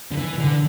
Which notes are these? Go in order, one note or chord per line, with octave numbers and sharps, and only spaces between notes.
D3
E3
D3